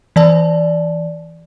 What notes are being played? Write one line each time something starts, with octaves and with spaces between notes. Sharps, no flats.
E3 D5 A5